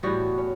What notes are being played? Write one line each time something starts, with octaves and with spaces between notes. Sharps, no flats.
A2 E3 G3 B3 F#4
C#4